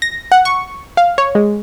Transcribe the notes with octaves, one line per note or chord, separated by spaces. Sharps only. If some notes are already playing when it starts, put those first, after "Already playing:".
A#6
F#5
C#6
F5
C#5
G#3